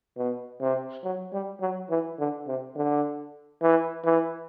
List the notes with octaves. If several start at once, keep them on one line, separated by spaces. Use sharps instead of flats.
B2
C3
F#3
G3
F#3
E3
D3
C3
D3
E3
E3